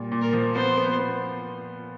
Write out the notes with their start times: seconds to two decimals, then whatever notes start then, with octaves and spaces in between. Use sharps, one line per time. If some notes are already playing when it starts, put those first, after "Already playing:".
Already playing: A#2 G3
0.12 A#2
0.22 A#4
0.33 F3
0.55 B3 C5
0.77 B3
0.99 B3